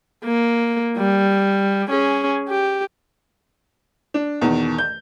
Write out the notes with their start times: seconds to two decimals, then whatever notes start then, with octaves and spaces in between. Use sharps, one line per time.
0.25 A#3
0.98 G3
1.89 C#4 G#4
2.48 G4
4.14 D4
4.41 E2 B2 D#3
4.78 G6